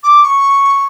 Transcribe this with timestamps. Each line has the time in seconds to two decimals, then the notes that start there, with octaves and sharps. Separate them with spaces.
0.03 D6
0.23 C#6